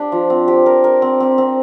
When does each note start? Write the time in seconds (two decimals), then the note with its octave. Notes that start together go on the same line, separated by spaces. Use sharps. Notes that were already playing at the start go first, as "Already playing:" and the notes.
Already playing: D4 G4
0.12 F3
0.30 C4
0.48 G4
0.66 A#4
0.84 A#4
1.02 C4
1.20 C4
1.38 C4